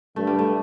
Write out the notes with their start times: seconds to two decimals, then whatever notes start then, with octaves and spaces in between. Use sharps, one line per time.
0.16 G2 A3
0.27 G3
0.39 A3